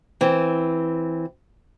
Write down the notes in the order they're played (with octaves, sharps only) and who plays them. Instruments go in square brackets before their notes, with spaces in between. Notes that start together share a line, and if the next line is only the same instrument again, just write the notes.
[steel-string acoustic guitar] E3 C4